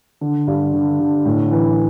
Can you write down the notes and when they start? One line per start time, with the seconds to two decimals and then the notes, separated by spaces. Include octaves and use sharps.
0.21 D3
0.47 G2
0.73 D3
1.00 D3
1.25 A2
1.51 E3